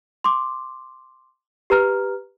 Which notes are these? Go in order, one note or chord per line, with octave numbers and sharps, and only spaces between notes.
C6 D6
G4 B4 A#5 F6